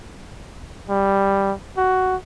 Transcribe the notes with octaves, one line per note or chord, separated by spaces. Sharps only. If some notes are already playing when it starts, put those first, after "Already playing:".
G3
F#4